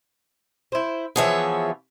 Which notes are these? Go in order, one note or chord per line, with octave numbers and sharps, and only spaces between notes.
E4 C5
E3 F3 B3 G#4 C#5 E5